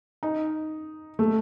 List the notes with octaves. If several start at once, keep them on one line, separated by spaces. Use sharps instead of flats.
D#4
A3